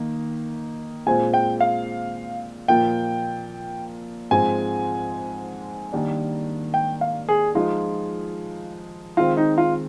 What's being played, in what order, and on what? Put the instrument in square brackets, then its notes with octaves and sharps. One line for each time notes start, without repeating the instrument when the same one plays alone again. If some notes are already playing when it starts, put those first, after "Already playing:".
Already playing: [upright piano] D#3 A#3 D#4
[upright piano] A#2 G#3 C4 F4 C5 [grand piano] G#5
[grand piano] G5
F5
[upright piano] A#2 F3 A#3 F4 A#4 [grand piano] G5
[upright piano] G#2 F3 G#3 C4 [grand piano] G#5
[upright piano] D#3 G3 A#3 D4
[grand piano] G5
F5
G#4
[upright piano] F3 G#3 D#4 [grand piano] F4
[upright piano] D#3 G#3 C4 [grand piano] F4
[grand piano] D#4
F4